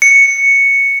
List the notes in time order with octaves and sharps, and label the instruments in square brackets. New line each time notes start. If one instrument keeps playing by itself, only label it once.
[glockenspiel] C#7